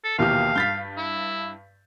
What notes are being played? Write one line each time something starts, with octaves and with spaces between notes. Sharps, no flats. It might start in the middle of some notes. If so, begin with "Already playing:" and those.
A4
A#1 D#2 B2 E3 G4 F5 F6
G2 G6 A6 B6
E4